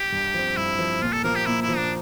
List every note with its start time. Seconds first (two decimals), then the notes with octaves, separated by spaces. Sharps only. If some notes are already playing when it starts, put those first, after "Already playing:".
Already playing: G4
0.12 G2
0.34 F3 C4
0.57 G2 E4
0.79 F3 C4
1.02 A#2 F4
1.13 A4
1.24 F3 A#3 A#4
1.36 G4
1.46 A#2 E4
1.62 E4
1.69 F3
1.74 A#3 D4